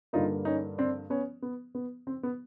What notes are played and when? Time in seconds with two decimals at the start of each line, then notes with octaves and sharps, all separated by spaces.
0.13 G2 D3 G3 A#3 D#4 F4
0.45 C#4 D#4
0.78 C4 D4
1.10 B3 C#4
1.42 B3
1.75 B3
2.07 C4
2.23 B3